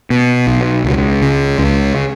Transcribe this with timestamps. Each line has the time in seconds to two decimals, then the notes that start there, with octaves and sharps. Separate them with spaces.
0.10 B2
0.47 B1
0.84 C#2
1.22 C#3
1.58 C#2